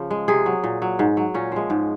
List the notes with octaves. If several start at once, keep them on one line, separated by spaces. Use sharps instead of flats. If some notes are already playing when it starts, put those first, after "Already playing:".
Already playing: C#3 F3
G#3
C3 G#4
F#3
A#2
F#3
G#2
F#3
A#2 C#4
F3 G#3
G#2